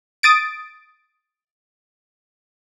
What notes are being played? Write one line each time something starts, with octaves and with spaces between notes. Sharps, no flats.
D#6 A6 D7